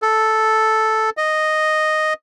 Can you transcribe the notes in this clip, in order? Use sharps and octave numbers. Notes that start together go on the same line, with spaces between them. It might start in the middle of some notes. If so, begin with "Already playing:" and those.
A4
D#5